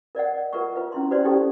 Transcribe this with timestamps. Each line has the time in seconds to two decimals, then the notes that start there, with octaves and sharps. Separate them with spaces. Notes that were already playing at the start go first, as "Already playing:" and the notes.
0.15 A#4 D5 D#5 F#5
0.53 F4 A#4 B4 E5 F#5 C#6
0.76 F4 B4 E5
0.92 C#4 E4 C6
1.11 F#4 B4 C5 D5 C6
1.24 C#4 D#4 E4 G4 A4 G5